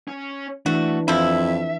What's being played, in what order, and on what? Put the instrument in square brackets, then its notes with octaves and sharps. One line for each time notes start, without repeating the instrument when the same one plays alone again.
[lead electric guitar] C#4
[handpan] E3 D4 [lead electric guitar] A3 [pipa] F#4
[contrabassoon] F2 [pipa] F3 E4 [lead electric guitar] E5